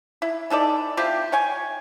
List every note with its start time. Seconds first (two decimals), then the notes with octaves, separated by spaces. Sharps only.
0.22 E4
0.50 E3 D#4 A4 D5
0.97 C4 E4 F4 G4
1.32 C#5 G5 G#5